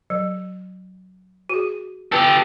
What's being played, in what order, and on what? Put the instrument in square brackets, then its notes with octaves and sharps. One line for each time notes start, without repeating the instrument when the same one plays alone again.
[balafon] F#3
F#4 G#4
[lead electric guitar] G4 A4 [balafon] B4